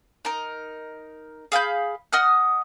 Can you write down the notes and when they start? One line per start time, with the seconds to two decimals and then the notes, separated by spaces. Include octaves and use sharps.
0.25 D#4 A#4
1.52 G#4 F5 B5 G6
2.13 D#5 F#5 D#6 F6